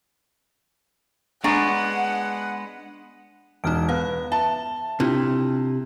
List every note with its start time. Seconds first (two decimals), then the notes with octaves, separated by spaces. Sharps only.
1.44 G#3 B3 D4 F#5 G#5 A#5 C#6
3.64 E1 D#4 F6 D7
3.89 B3 F5
4.32 E5 A5
5.00 C3 D4 E4 F4